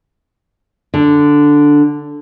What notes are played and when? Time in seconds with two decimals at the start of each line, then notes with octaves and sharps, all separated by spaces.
0.94 D3